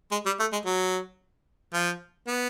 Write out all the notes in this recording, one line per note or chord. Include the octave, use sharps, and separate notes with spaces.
G#3
G3
A3
G#3
F#3
F3
B3